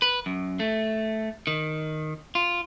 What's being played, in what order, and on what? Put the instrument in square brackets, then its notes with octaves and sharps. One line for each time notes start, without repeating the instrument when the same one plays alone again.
[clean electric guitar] B4
F#2
A3
D#3
F4